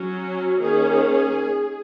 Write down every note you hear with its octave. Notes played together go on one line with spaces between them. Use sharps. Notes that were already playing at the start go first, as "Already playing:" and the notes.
Already playing: F#3 C#4 F#4
D#3 A#3 C#4 G#4